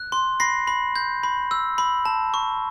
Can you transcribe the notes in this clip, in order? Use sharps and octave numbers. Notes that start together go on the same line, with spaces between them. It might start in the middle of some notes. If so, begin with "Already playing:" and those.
Already playing: F#6
C6
B5 A#6 C7
B5
G6
B5
E6
B5
A5
C#6